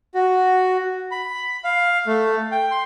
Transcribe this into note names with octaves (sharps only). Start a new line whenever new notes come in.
F#4
B5
F5
A3
G5
C6